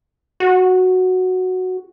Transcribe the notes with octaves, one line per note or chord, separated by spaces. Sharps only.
F#4